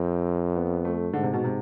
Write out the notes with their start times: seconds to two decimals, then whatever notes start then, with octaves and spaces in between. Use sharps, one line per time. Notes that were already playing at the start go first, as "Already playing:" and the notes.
Already playing: F2 C4
0.56 B3
0.85 A3
1.13 G#2 D3
1.23 C3
1.33 B2
1.44 C3